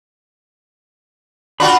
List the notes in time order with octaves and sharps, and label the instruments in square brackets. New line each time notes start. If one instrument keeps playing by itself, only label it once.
[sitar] D4 F4 F#4 [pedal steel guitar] B5